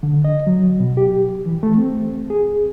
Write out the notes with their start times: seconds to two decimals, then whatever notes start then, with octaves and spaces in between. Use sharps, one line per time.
0.03 D3
0.24 D#5
0.47 F#3
0.80 B2
0.97 G4
1.46 E3
1.63 A3
1.77 C4
2.30 G#4